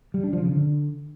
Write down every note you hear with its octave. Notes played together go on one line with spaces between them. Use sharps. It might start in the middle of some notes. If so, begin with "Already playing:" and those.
G3
D4
F3
C#3
D3